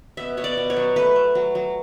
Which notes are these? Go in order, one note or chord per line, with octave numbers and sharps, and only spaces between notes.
B2 E5
B2 C#5
D5
B2
C#5
F#3
A3 B4
A3
F#3
F#3